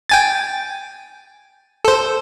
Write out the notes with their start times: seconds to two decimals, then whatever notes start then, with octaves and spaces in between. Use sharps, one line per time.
0.09 G5 G#5 A6
1.85 A4 C5